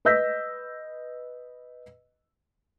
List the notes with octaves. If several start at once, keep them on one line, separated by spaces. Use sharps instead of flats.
B4 D#5 E6 G6 A#6 B6